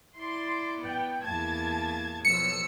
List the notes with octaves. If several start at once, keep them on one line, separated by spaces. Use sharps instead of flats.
E4 D5 C6
B3 G5
E2 A#3 A5 G#6 A6
B1 F3 E6 C#7